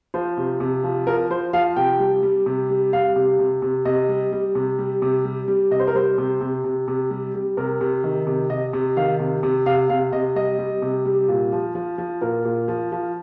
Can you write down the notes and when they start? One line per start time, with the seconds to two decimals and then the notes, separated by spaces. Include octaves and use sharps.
0.14 F3 C5
0.37 C3
0.60 C3
0.84 F3
1.07 F3 A#4
1.30 F3 C5
1.53 F3 F5
1.76 C3 G5
2.00 G3
2.23 G3
2.46 C3
2.70 G3
2.93 G3 F5
3.16 C3
3.39 C3
3.62 C3
3.85 C3 D#5
4.09 G3
4.32 G3
4.55 C3
4.79 G3
5.02 C3
5.25 G3
5.48 G3
5.71 C3 D#5
5.80 C5
5.88 A#4
5.95 G3 C5
6.18 C3
6.41 C3
6.64 C3
6.88 C3
7.10 G3
7.34 G3
7.57 C3 A#4
7.81 C3
8.04 D#3
8.27 C3
8.50 C3 D#5
8.73 C3
8.97 D#3 F5
9.20 C3
9.43 C3
9.66 C3 F5
9.90 C3 F5
10.12 C3 D#5
10.36 G3 D#5
10.59 G3
10.82 C3
11.05 G3
11.28 A#2
11.52 F3
11.75 F3
11.98 F3
12.21 A#2 A#4
12.45 A#2
12.68 F3
12.92 F3